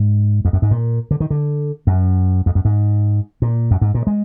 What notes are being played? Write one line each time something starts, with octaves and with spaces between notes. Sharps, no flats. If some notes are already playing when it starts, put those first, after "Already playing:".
Already playing: G#2
F2
F#2
G#2
A#2
D3
D#3
D3
F#2
F2
F#2
G#2
A#2
F#2
G#2
A#2
G#3